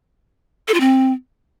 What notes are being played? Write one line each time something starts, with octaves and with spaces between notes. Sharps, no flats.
A4
F4
C4